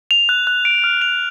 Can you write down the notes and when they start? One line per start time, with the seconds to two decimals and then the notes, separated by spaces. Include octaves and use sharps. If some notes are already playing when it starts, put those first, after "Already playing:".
0.11 F7
0.29 F#6
0.47 F#6
0.65 D7
0.84 F6
1.02 F7